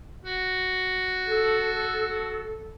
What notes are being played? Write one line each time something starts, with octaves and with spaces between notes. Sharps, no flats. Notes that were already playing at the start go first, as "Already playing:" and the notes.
F#4
A4